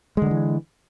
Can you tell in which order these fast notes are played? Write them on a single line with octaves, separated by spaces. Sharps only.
G#3 D3 G3 E3